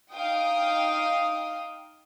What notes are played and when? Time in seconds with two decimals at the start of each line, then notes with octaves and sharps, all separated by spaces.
0.13 D#4 F5 G5 D#6